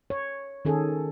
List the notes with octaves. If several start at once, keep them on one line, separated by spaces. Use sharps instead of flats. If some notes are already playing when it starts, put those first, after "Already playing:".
C#5
D#3 C#4 G#4 A4